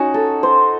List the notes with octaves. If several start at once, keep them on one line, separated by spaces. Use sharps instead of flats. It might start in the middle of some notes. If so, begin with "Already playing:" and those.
Already playing: C#4 D#4 F#4
A4
C5